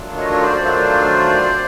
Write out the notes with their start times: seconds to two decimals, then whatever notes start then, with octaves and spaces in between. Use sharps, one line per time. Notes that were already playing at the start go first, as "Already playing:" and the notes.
Already playing: D#3 F#3 A3 D4 F4
0.17 C#5 D#5
0.32 C#5
0.41 C5 D5
0.63 D#3 F#3 A3 D4 F4 C5 D5